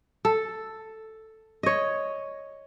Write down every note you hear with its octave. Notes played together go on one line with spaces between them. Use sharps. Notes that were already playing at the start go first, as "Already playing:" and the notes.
A4
C#5 D#5